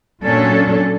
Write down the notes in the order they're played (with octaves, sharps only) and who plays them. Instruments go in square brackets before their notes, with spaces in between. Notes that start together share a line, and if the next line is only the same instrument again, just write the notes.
[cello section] A#2 F#3 C#4 D4 A4